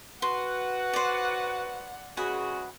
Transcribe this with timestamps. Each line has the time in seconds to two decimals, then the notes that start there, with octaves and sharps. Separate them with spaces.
0.22 F#4 B4 F#5 C6
0.93 C5 D5
2.17 C#3 G#3 F#4 B4 F#5 G#5